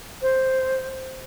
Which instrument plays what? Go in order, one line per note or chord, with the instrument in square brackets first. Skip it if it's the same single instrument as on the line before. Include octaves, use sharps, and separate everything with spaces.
[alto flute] C5